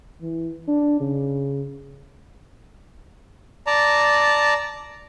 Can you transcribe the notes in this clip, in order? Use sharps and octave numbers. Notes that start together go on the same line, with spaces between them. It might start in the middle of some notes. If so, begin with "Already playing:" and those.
E3
D4
C#3
D5 A5 A#5